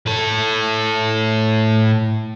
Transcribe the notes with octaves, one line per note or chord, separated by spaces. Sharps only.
A2 A4